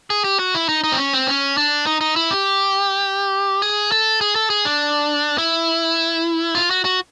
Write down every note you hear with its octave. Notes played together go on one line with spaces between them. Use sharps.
G#4
G4
F#4
E4
D#4
D#4
C4
C#4
C4
C#4
D4
D#4
D#4
E4
G4
G#4
A4
G#4
A4
G#4
D4
E4
F4
F#4
F#4